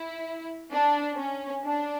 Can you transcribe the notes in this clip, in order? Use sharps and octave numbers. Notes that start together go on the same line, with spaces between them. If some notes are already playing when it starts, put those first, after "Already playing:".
Already playing: E4
D4
C#4
D4